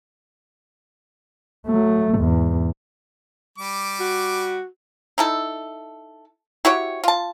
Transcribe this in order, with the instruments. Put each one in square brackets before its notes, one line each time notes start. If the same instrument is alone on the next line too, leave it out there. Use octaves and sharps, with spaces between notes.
[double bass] F#3 A3
E2 G#2
[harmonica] G3 D6
[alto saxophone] F#4
[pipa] D#4 E4 A4
E4 F#4 G4 C#5
F4 A5